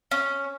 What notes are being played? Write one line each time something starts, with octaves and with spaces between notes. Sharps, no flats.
C#4